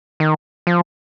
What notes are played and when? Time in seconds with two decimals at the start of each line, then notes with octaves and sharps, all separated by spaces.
0.20 D#3
0.67 F3